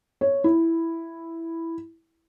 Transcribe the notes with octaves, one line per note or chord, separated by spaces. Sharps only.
C#5
E4